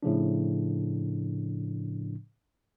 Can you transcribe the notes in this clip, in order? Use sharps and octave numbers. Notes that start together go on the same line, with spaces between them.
A2 C#3 F3 D4